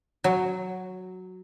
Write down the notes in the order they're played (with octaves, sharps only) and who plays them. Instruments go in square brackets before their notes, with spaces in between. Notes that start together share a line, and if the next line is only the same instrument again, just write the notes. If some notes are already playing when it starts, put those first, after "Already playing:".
[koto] F#3